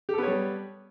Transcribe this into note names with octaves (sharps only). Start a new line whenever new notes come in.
G3 B3 G4 A4 C#5